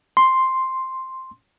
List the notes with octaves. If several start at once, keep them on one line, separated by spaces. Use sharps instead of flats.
C6